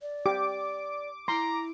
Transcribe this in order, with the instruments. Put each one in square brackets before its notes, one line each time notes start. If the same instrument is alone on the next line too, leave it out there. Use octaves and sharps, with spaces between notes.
[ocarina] D5
[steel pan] G4 [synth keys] D6
[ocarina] E4 [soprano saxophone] A#5 [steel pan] C6